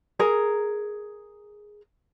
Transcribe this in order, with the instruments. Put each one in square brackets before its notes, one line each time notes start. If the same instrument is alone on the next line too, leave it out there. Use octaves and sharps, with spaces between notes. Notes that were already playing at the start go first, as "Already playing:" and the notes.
[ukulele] G#4 A#4 A#5